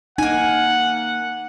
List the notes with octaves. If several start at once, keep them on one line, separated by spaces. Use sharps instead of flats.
A#3 D#4 F#5 G#5